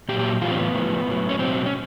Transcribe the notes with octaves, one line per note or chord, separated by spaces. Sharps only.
A#2 F#3 G4
G4
A2 E3 F4
C4
B3
A2 F3
A2 F#3
C#4
B2 F#3 C4
C#4